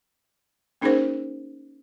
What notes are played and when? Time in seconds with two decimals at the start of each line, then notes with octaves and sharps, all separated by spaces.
0.81 A#3 C#4 D#4 G#4 A#4 C5